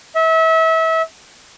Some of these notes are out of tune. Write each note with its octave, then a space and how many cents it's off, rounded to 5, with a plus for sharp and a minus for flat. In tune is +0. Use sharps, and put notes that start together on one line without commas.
E5 -30